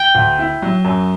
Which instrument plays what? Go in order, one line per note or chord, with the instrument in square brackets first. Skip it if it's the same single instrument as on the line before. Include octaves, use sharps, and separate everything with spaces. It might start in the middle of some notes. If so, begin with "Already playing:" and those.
Already playing: [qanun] G5
[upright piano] D2
E4
F#3
F#2